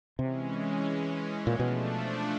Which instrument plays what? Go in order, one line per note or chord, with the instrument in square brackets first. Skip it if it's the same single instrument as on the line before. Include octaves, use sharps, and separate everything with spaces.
[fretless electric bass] C3 [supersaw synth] E3 G#3 C#4
[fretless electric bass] A#2
[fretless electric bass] B2 [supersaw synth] F3 A3 D4